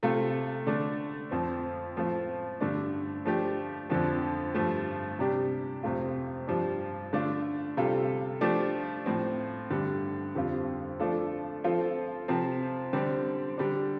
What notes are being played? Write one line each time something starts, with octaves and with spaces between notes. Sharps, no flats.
C3 A3 F4 A4
D3 A3 D4
F2 F3 C4
A2 F3 A3 C4 F4
G2 D3 A3 D4
F3 A3 D4 G4
F2 D3 F3
G2 F3 A3
C3 G3 D4 G4
F2 C3 A3 F4
G2 F3 D4 G4
D3 A3 D4 F4
C3 G3 F4 A4
F3 A3 D4 G4
A2 F3 C4
G2 D3 G3
F2 D3 G3 C4 F4
F3 A3 D4 F4 A4
F3 C4 F4 A4
C3 F3 C4
D3 G3 C4 G4
D3 G3 D4